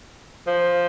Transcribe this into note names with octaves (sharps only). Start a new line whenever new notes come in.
F3